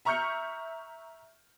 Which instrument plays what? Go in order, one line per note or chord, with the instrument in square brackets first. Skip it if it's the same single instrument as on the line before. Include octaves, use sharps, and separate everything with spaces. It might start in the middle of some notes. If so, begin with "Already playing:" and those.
[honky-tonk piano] E5 A#5 C#6 F6 G6 C#7